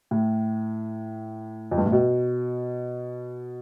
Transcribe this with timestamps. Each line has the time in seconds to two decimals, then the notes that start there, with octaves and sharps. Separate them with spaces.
0.11 A2
1.71 F2
1.78 G2
1.86 A2
1.92 B2